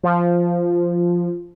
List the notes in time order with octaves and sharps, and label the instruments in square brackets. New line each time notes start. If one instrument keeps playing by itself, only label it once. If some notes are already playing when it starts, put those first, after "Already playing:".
[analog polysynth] F3